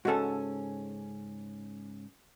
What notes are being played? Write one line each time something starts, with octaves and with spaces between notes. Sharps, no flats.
G#2 C#3 C#4 F#4 A4